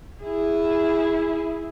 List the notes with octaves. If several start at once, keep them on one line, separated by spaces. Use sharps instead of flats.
E4 G#4